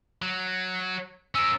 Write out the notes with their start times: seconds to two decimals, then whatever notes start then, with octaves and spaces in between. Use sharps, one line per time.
0.22 F#3
1.35 C#4 A#4 E6